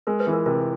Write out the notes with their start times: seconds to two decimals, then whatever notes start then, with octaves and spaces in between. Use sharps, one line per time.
0.07 G#3 A#4
0.20 B4
0.27 E3
0.33 A#4
0.46 C3 A#4